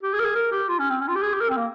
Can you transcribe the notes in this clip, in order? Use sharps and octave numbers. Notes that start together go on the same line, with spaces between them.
G4
G#4
A#4
G#4
A#4
G4
F4
C#4
C4
C#4
F4
G4
G#4
G4
A#4
C4
A#3